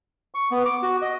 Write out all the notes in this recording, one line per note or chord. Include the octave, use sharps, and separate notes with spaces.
C#6
B3
D6
F#4
D#5